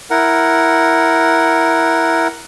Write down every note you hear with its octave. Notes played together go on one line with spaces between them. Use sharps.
E4 A#4 F#5